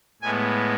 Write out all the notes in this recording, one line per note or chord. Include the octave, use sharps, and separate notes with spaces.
A2 G#3 B3 G#5